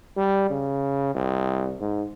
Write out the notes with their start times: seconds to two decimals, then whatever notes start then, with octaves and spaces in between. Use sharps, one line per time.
0.17 G3
0.50 C#3
1.15 C2
1.80 G#2